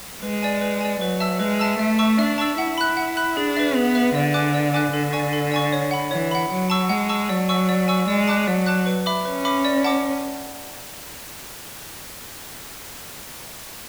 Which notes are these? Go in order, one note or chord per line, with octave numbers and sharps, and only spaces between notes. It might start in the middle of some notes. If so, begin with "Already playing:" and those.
G#3 B4
D5 G#5
B4
D5 G#5
F#3 B4
E5 A5 E6
G#3 B4
E5 A5 E6
A3 E5
A5 C#6 E6
D4 E5
A5 C#6 E6
E4 F#5
B5 F#6
F#5
B5 F#6
D4 G#4
B4 E5
B3 G#4
B4 E5
D3 D5
G#5 D6 F#6
D5
G#5 D6 F#6
D3 A4
D5 G#5 C#6
A4
D5 G#5 C#6
C#5
F#5 B5
E3 C#5
F#5 B5
F#3 F#5
A5 C#6 E6
G#3 F#5
A5 C#6 E6
F#3 D5
G#5 C#6 E6
D5
G#5 C#6 E6
G#3 D5
A5 D6 F#6
F#3 D5
A5 D6 F#6
B4
E5 B5 D6
C#4 B4
E5 B5 D6
D5
F#5 A5 D6